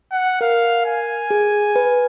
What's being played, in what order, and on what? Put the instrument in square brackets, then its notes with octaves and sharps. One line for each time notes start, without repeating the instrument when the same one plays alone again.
[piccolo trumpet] F#5
[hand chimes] A#4 [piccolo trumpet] F5
[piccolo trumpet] G#5
[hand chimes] G#4
B4